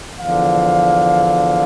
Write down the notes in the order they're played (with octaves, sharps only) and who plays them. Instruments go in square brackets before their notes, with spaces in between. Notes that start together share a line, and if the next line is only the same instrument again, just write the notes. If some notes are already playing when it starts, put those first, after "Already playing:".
[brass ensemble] E2 D3 F3 F5